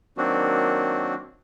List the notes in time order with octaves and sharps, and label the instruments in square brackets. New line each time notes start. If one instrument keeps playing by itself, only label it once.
[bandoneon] D#3 F#3 A#3 C4 D4 F#4